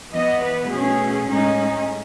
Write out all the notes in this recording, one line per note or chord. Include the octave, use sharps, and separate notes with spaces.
E3 B3 D#5
B4
B2 A3 C#4 G#4
A2 G#3 C#4 D#4